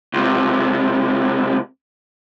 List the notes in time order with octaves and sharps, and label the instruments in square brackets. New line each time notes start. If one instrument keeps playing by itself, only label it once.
[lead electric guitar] C#2 C3